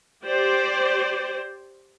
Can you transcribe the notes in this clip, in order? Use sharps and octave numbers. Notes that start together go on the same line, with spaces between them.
G4 C5 D5